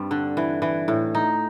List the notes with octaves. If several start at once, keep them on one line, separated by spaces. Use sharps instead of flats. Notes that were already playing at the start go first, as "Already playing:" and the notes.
Already playing: G2 G3 C4
D3
E3
E3
A2
D#4